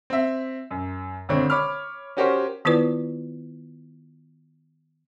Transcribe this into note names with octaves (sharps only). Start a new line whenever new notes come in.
C4 E5
F#2
G#1 D3 C4 C#5
C#5 B5 D6 F6
C#4 F#4 G4 A#4 C5 C#5
D#3 B3 E4 F4 B4 D5